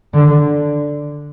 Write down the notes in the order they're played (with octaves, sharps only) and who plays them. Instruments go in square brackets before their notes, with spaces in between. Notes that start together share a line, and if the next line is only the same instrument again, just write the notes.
[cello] D3